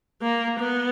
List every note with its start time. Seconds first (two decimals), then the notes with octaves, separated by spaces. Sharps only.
0.22 A#3
0.59 B3